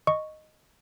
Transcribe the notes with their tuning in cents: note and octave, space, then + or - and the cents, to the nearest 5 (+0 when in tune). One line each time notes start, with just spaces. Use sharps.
D#5 -5 C#6 +0